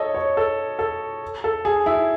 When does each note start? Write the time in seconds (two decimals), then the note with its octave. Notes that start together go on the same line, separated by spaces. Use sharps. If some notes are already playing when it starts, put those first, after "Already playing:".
Already playing: A4 C#5 D#5
0.15 C#5
0.37 A4
0.79 A4
1.44 A4
1.65 G#4
1.86 E4